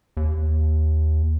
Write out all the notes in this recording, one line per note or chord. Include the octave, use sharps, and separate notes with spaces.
D#2